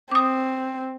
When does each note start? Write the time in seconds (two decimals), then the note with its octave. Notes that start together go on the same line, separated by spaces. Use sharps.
0.11 C4 D6 D#6